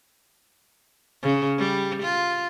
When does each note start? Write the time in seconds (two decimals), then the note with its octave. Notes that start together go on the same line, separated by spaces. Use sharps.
1.22 C#3
1.58 G3
2.03 F4